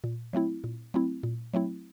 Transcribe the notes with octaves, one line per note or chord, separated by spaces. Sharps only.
A#2
F#3 A3 C4 E4
A#2
F#3 A3 C4 E4
A#2
F#3 A3 C4 E4